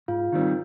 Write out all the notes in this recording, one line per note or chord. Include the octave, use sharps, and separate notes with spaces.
G#2 F4 F5
D#3 G3 C4